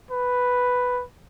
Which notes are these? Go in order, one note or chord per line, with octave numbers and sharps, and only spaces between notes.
B4